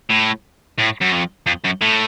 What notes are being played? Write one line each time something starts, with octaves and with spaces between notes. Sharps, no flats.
A2
A2
F#2
F2
F2
F#2
A2